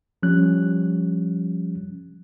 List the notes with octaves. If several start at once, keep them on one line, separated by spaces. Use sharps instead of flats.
F3 G3 C#4 F#6